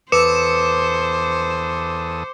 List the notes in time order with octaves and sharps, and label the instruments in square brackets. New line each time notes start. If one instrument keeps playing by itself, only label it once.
[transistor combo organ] E2 A4 D#6 [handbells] B4 [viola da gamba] C5 [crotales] D6 C#7 E7